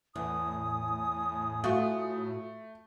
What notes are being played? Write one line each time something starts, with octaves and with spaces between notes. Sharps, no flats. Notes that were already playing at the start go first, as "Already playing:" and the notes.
E2 A2 G#5 D#6
A3 F4 F#4